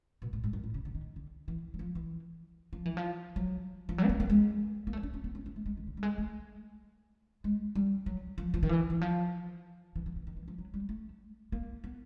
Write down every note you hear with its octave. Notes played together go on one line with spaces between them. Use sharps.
B2
A2
G#2
F#2
A2
C#3
D3
D#3
D3
E3
F#3
F3
E3
F3
E3
F3
F#3
F3
F#3
C4
B3
A#3
G#3
A#3
A3
D4
C#4
B3
C#4
C#4
A3
G#3
D#3
D3
G3
G#3
A3
G#3
G3
F#3
F3
F3
D#3
E3
E3
F3
E3
E3
E3
D#3
E3
F3
F#3
G3
A3
A#3
B3